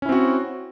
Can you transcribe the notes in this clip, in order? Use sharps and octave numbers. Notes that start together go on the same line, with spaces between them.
C4 C#4 E4 F#4